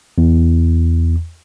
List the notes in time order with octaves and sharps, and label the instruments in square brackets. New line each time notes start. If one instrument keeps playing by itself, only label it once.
[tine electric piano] E2